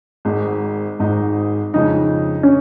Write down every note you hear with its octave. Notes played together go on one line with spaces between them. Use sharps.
G#1 G#2 G#3 D#4
G#1 G#2 G#3 D#4
F2 C#3 G#3 D#4
C#4